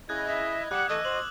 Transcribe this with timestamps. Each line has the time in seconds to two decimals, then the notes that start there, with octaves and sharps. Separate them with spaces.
0.09 C#3 E4 D#5 D#6 F#6 G#6
0.27 E5
0.71 G3 F#5 D6 F#6
0.89 E3 A3 D#5 E6
1.05 F#4 C5 F#6 F#7